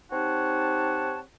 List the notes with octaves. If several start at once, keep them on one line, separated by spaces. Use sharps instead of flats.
C4 D#4 G4 C#5 F#5 A5